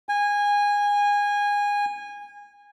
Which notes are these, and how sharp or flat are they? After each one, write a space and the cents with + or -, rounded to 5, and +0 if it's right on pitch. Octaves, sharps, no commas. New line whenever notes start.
G#5 -20